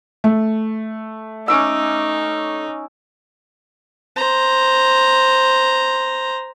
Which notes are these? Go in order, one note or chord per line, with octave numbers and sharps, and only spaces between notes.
A3
C#4 D#4 D6 E6
C5 A#5